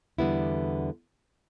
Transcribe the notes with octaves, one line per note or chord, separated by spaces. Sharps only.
E2 D3 G3 B3 E4